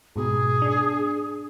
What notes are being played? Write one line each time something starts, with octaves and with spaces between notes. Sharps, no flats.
G#2 B2 G#4
D4